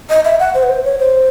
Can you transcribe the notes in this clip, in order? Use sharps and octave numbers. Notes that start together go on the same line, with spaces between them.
D#5
E5
F#5
C5
B4
C5
C#5
C5